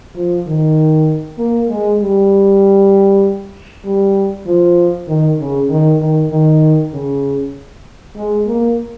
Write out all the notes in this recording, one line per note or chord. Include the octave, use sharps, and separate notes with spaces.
F3
D#3
A#3
G#3
G3
G3
F3
D#3
C#3
D#3
D#3
D#3
C#3
G#3
A#3